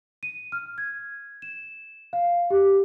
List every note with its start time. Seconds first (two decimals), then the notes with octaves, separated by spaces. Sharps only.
0.23 D#7
0.52 F6
0.78 G#6
1.42 E7
2.13 F5
2.51 G4